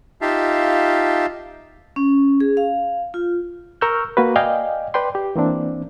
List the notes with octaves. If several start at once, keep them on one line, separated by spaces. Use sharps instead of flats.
D#4 F4 G4 E5 F5 A5
C#4
G#4
F5
F4
A#4 C#6 E6 F6 G6
A#3 F#4 B4
D5 D#5 F5 G5 G#5
B4 D5 G5 C6
G4
E3 A#3 C4 D4